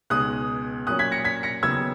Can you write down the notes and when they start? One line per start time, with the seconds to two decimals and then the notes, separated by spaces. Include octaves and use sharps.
0.10 C#2 B2 G#3 D#4 D#6 F#6
0.87 A#2 F#3 C#4 D#6 F#6
0.99 G#6 B6
1.12 A#6 C#7
1.24 G#6 B6
1.43 A#6 C#7
1.63 D#2 C#3 F#3 B3 D#4 E6 G#6